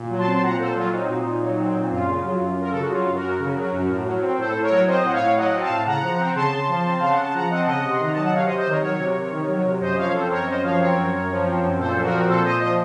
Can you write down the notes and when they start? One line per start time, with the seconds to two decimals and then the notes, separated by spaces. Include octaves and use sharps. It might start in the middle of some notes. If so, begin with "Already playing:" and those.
Already playing: A#2
0.10 F#3
0.18 A5 C6
0.26 C4
0.35 C6
0.43 A#2 F#5 A#5
0.59 A#2 A4 C5
0.76 F#3 F4
0.92 C4 D#4
1.09 A#2
1.25 A#2
1.42 F#3
1.58 C4
1.74 A#2
1.90 F#2 F4
2.07 C#3
2.24 F#3
2.40 F#2
2.57 F#2 A#4
2.71 C#3 A4
2.80 F#4
2.89 F#3 F4
3.06 F#2
3.14 F#4 A#4
3.23 F#2
3.39 C#3
3.56 F#3
3.72 F#2
3.89 A2
4.05 F#3
4.21 C4
4.38 A2 A4 C5
4.54 A2
4.62 A#4 C#5
4.71 F#3
4.87 C4 C5 D#5
5.04 A2 F#5
5.12 C#5 F5
5.20 A2
5.36 F#3 D#5 F#5
5.53 C4
5.61 F5 A5
5.69 A2
5.86 C#3 F#5 A#5
6.02 F3
6.19 C4
6.35 C#3 A5 C6
6.51 C#3
6.68 F3
6.85 C4
7.00 C#3 F5
7.10 F#5
7.17 C#3
7.23 A5
7.34 F3 F#5 A#5
7.50 C4 D#5 F#5
7.61 A5
7.66 C#3 D#5 F#5
7.84 C3
7.91 C6
8.00 D#3 A#5
8.12 F#3 A5
8.22 F#5
8.33 C3 C#5 F5
8.45 C5 D#5
8.49 C3
8.58 C5 D#5
8.66 D#3 A#4 C#5
8.82 F#3 A#4 C#5
8.99 C3
9.15 C3
9.31 D#3
9.48 F#3
9.65 C3
9.80 F#2 C5 D#5
9.98 F3 C#5 F5
10.14 C4 A4 C5
10.30 F#2 A#4 C#5
10.47 F#2 C5 D#5
10.63 F3 C#5 F5
10.80 C4 A#4 C#5
10.97 F#2
11.13 F#2
11.29 F3
11.45 C4
11.62 F#2
11.78 A#2 A4 C5
11.95 F3
12.03 F#4 A#4
12.11 C4
12.28 A#2 A4 C5
12.44 A#2 C5 D#5
12.60 F3 C5 D#5